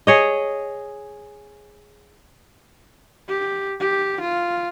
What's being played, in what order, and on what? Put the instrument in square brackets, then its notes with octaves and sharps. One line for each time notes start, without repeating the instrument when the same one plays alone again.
[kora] G#4 C#5 D#5
[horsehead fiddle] G4
G4
F4